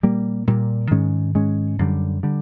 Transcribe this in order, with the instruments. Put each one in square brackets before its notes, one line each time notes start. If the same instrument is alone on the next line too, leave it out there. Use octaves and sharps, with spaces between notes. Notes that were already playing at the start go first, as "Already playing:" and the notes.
[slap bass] A#2 G3 A#3
A#2 G3 A#3
G#2 D#3 G#3 C#4
G#2 D#3 G#3 C#4
F#2 D3 G3
D3 G3